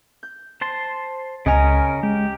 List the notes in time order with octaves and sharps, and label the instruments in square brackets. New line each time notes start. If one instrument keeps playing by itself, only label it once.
[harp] G6
[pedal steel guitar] C5 A5 C6
[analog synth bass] C#2 [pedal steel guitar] C#3 C#4 A#4 [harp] D#5 G#5 A#5
[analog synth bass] G#3 [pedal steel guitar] G4